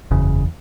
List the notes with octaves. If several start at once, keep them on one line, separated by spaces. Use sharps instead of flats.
F#1 E2 C#3